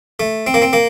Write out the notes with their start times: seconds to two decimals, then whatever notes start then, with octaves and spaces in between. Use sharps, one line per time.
0.20 A3
0.47 C4
0.54 A#3
0.62 C4
0.73 A#3